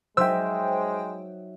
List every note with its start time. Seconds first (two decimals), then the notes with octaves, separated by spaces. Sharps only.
0.17 F#3 G#3 D#4 C5 E5 G5 E6